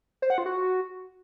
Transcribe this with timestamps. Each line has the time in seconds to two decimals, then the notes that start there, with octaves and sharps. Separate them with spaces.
0.22 C5
0.30 F#5
0.38 F4
0.46 F#4